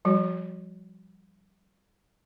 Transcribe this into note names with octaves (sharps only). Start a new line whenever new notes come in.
F3 G3 F#4